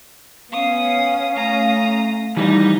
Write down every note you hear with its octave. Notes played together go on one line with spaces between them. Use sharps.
B3 C#4 F5 D#6
A3 A#5 D#6
D#3 E3 G3 D#4 D5